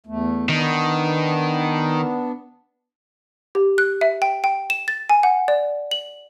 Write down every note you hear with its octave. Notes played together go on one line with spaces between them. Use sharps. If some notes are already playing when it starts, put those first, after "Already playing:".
E2 A3
D#3 B3 D4
G4
F#6
E5
G5
G5
E7
A6
G#5
F#5
D5
F#7